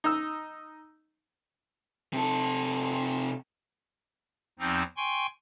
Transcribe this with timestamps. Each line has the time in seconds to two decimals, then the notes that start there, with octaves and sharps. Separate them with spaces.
0.04 D#4 E6
2.13 C3 A4
4.59 E2 F3 C4 D#4
4.97 G5 G#5 C6 C#6